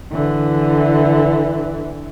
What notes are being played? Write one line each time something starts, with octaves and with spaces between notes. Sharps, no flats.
D3 E3